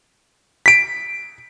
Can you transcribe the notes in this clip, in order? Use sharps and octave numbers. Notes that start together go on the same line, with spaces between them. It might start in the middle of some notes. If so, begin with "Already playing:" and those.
B6 D7